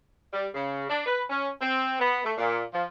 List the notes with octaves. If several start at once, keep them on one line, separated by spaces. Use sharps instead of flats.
G3
C#3
D4
B4
C#4
C4
B3
A3
A#2
F3